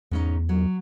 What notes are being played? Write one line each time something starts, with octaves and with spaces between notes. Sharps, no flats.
E2 G#2 C#4 D#4
F#3